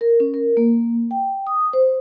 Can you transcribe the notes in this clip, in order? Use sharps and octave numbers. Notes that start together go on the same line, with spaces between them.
A#4
C#4
A#4
A#3
G5
D#6
C5